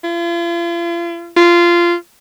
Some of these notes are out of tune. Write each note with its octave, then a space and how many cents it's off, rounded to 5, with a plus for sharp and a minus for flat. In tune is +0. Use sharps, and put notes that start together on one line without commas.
F4 -40
F4 -15